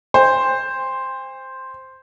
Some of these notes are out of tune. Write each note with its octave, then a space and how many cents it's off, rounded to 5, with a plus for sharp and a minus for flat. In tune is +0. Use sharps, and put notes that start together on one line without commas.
C5 +0 G5 +45